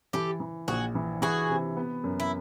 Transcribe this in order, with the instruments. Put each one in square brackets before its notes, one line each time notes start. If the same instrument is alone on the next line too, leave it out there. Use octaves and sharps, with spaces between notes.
[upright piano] E3 [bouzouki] G4 A4
[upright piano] E3
[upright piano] A#1 [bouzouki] F#4 G#4
[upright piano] E3
[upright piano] E3 [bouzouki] F#4 G#4
[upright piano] C3
B3
F#2
[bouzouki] E4